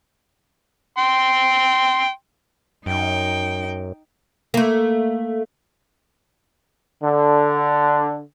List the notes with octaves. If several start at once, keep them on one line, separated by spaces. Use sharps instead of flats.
G5 C6
F#2 D#4 G5
A3 A#3
D3